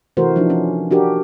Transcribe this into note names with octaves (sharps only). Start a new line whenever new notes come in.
C3 E3 A3 F#4 A#4 C5
F3 D4 D#4
F3 C#4
D4 F#4 G4 A#4